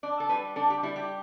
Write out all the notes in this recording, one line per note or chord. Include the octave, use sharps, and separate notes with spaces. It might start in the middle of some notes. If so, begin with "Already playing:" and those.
D4 D5
A4
G3 B4
D4 A4
G4
G3 E4
G4